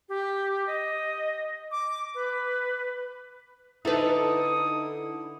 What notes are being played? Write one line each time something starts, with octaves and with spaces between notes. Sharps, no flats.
G4
D#5
D6
B4
D3 D#4 E4 A4 B4 D#6